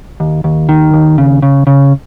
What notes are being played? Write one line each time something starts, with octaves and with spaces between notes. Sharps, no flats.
D#2
D#2
D#3
D#2
C#3
C#3
C#3